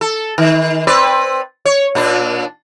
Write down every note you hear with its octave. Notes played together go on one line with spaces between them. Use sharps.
A4
D#3
C4 B4 D5
C#5
A#2 D4